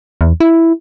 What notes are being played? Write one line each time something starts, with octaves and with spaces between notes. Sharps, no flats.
E2
E4